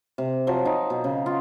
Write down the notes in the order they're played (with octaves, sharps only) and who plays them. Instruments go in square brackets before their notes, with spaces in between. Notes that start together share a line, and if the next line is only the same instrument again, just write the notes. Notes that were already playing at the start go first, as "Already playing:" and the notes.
[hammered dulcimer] C3
F3 F#3
D#4
B2
C#3
F4